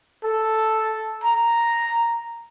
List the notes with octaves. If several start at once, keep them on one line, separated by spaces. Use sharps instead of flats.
A4
A#5